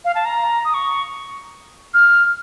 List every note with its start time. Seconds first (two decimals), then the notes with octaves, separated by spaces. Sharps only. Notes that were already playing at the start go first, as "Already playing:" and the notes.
0.05 F5
0.15 A5
0.25 A#5
0.65 D#6
0.74 C#6
1.94 F6